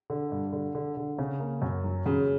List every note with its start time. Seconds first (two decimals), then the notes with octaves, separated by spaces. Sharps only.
0.10 D3
0.32 G2
0.53 D3
0.75 D3
0.97 D3
1.19 C#3
1.40 A#3
1.62 F#2
1.84 F#3
2.06 F#2 C#3